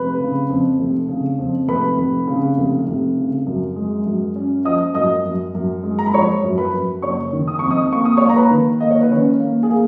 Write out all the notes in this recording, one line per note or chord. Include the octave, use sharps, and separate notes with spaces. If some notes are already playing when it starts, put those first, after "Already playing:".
Already playing: F1 B4 B5
C#3
F2
F1
C#3
F2
F1 B4 B5
F1
C#3
F1
F1
C#3
F#2
G#3
F#2
C#4
F3 D#5 D#6
F#2 D#5 D#6
F#2
F#2
G#3
A#5
B5
F3 C#5 C#6
F#2
B4 B5
F#2
F#1 C#5 C#6
D#3
D#6
F2 C#6
D#5 D#6
A#3 C#6
D#6
C#5 C#6
A#3
A#5
B4 B5
D#3
A#3 D#5
C#5
B4
D#3 C#4 C#5
A#3
G#4
A#3 A#4